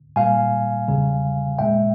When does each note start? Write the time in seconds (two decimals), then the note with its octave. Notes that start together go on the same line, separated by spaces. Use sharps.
0.16 A#2 G3 F5 G#5
0.88 E2 C#3 G3
1.59 A#2 G#3 E5 G5